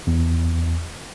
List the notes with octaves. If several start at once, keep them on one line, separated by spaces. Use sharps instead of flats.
E2